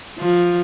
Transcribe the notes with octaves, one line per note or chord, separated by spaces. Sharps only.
F3